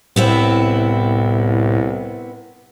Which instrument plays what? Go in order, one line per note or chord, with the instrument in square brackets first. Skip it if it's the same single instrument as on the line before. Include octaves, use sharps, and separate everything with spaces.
[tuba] C2 [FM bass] A2 [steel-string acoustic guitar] B3 C4 E4